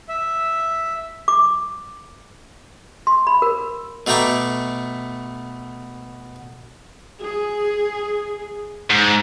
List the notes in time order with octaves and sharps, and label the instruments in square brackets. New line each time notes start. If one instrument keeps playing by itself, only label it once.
[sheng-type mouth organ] E5
[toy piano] D6
C6
B5
A#4
[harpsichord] B2 A3 G5 A#5 C#6 D6
[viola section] G#4
[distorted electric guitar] G#2